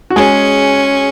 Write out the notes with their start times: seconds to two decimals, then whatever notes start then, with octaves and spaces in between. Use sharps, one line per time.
0.10 F#4
0.16 G#3 C#4 G#4